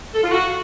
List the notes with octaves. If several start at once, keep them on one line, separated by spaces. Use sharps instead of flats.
A4
F4
F#4